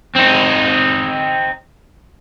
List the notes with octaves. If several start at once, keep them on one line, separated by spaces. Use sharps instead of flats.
C4 D#4